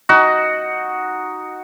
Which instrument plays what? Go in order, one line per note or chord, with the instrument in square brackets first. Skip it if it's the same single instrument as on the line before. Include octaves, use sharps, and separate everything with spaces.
[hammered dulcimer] D#4 F#4